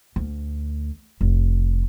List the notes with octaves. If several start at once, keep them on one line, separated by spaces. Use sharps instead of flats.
D2
F1